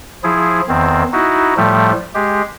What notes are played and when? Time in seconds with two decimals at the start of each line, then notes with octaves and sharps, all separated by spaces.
0.24 F3 E4 G#4
0.69 E2 D#3 C4
1.13 D#4 E4 F#4
1.57 A2 F3 G3 A3
2.15 G#3 G4